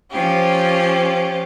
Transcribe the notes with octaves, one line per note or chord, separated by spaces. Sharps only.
F3 C#4 F4 G4